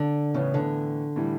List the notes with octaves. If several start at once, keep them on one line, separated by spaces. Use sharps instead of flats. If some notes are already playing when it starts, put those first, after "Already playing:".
Already playing: D3
A2 C#3 E3 B3
D3
A2 E3 G3